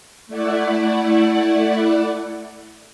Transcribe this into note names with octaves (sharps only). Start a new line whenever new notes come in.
A3 E4 D5 F#5